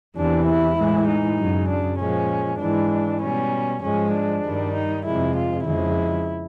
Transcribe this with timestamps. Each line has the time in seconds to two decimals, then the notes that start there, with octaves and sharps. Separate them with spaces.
0.16 E2 C3 E3 D4
0.46 E4
0.77 A2 E3 G#3
1.08 D#4
1.38 F#2 C#3 F#3
1.69 D4
2.00 A#2 F3 G#3 C#4
2.60 G#2 E3 G#3 D4
3.21 B2 G3 C#4
3.82 G#2 F3 G#3 C#4
4.13 D4
4.43 G2 D#3 G3
4.74 D#4
5.05 F2 C3 F3 G#3 E4
5.36 F4
5.66 F2 C#3 F3 G#3 E4